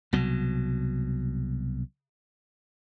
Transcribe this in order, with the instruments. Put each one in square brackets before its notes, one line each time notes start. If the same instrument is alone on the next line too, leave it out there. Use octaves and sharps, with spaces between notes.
[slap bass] C2 B2 F#3